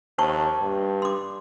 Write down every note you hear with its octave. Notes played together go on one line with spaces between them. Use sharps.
D#2 C5 A5 C#6
G2
C6 D6